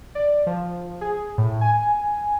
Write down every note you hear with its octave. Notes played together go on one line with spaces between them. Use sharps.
D5
F3
G#4
A2
G#5